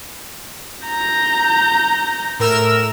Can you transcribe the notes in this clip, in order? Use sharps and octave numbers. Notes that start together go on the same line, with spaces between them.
A#5 G6
A2 A#4 E6